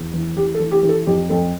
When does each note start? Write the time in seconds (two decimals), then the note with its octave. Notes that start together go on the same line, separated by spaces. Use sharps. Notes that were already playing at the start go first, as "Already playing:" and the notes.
Already playing: E2
0.13 E3
0.36 E3 G4
0.55 A4
0.60 E3
0.71 G4
0.83 E3 G4
0.89 A4
1.06 F2 G4
1.30 F2 A4